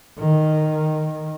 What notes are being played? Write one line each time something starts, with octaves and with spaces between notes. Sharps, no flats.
D#3